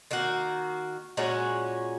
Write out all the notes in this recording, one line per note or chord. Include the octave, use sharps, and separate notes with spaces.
D#3 A#3 F#4
A#2 G#3 C#4 F#4